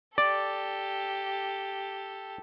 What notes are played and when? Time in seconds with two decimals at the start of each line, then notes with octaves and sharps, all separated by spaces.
0.18 G4 A4 D5